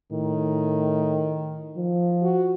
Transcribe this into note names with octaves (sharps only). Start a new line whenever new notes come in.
A2 D#3
F3
F#4